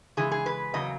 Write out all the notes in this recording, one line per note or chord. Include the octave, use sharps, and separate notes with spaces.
C#3 E3 G#3 G#4
G#4
B4
E2 C#3 F#3 A#3 D#5